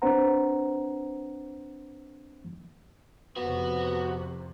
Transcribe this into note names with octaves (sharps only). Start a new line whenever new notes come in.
C4 D4 B4 C5 F#5 A#5
F2 C3 B3 F#4